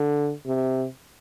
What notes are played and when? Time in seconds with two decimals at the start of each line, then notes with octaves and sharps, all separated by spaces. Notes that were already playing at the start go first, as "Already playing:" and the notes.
Already playing: D3
0.46 C3